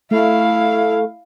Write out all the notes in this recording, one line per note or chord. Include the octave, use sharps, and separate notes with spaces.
A3 E4 F5